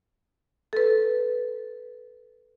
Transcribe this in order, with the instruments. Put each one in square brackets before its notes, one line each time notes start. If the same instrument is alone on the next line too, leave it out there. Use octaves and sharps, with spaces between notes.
[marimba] A4 B4